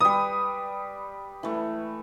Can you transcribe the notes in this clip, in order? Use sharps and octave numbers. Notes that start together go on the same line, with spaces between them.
G3 B4 D#6
E3 A3